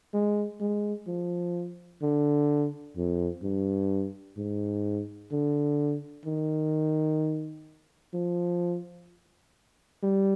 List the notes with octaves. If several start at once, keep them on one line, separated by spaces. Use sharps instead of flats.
G#3
G#3
F3
D3
F2
G2
G#2
D3
D#3
F3
G3